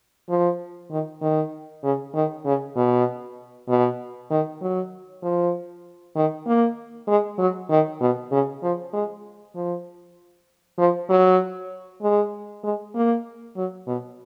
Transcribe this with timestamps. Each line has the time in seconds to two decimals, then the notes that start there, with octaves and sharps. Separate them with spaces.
0.29 F3
0.91 D#3
1.22 D#3
1.84 C#3
2.14 D#3
2.45 C#3
2.76 B2
3.69 B2
4.30 D#3
4.61 F#3
5.23 F3
6.16 D#3
6.47 A#3
7.08 G#3
7.38 F#3
7.70 D#3
8.01 B2
8.31 C#3
8.63 F3
8.93 G#3
9.55 F3
10.78 F3
11.09 F#3
12.02 G#3
12.64 G#3
12.95 A#3
13.56 F#3
13.87 B2